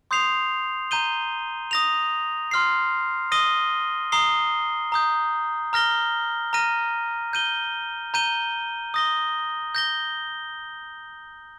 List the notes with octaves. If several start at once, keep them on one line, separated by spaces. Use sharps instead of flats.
C6 D#6 G6 C7 F7
A#5 G6 D#7 G7
D#6 A#6 F7
C6 F6 C7
D#6 A#6 D#7 G7
A#5 D#6 C7 G7
A#5 D#6 G6
A#5 F6 A#6 G7
A#5 F6 A#6 D#7
G6 D#7 G7
A#5 G6 D#7 G7
D#6 A#6 G7
G6 A#6 G7